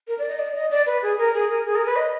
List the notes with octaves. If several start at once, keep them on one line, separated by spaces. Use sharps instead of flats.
A#4
D5
D#5
D5
D#5
D5
B4
G#4
A#4
G#4
A#4
G#4
A#4
B4
D#5